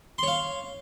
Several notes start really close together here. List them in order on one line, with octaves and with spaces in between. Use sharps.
C6 C#5 F5